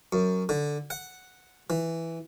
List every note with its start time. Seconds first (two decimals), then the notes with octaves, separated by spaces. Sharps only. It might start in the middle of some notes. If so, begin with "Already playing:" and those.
0.13 F#2
0.49 D3
0.90 F#5
1.70 E3